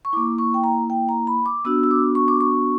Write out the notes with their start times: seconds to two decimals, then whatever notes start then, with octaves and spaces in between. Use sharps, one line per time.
0.05 C#6
0.13 A#3 E4 D6
0.38 C#6
0.54 G5
0.64 A#5
0.90 G5
1.09 A#5
1.27 B5
1.46 D6
1.65 B3 D4 F#4 E6
1.83 E6
1.91 D6
2.15 C#6
2.28 D6
2.41 C#6